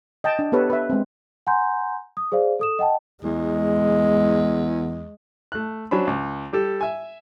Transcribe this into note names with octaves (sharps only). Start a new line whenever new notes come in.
D#5 G5 A5
D4
B3 G4 A4 B4 C#5
B4 E5
G#3 C4
F#5 G#5 A#5 C6 G6
D#6
G#4 C5 D5 F5
A4 D#6 E7
D#5 F#5 G5 A5
E2 G#3
A3 F#6
F#3 C#4 D4 C5 B5
C#2
G3 G4 A4
E5 G#5